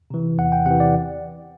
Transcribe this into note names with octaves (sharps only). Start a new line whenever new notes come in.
C3 E3
E2 F#5
G5
C3 E3 F#5
D5